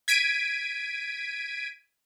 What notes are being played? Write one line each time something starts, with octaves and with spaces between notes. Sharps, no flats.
G#6 B6 D7 D#7